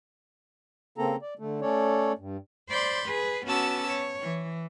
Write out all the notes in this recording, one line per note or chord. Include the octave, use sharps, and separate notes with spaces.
C#3 A#3 C4 A4 A#5
D5
D3 A3
A3 C#4 A4 C#5 D5
G2
C5 D5 B5 C6 G6 A6
G#4 B4
B3 C#4 F#4 A5 D6 E6
C#5
E3